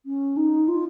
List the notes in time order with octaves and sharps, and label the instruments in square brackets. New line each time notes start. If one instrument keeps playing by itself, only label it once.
[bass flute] C#4
D#4
F4